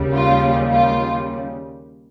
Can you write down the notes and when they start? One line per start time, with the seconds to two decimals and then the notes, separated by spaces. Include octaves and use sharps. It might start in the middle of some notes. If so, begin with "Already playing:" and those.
Already playing: D#2 C#3 G3
0.13 F4
0.70 F4